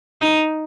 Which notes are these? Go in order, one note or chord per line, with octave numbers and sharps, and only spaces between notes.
D#4